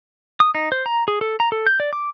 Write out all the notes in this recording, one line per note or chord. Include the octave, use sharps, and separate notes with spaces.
D#6
D#4
C5
A#5
G#4
A4
A#5
A4
G6
D5
D6